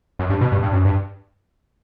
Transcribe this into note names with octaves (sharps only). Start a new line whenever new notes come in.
F#2
G2
B2
G2
G2
F#2
G2